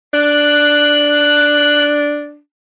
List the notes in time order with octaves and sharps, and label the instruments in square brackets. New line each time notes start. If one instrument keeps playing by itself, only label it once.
[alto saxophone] D4 [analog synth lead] F#6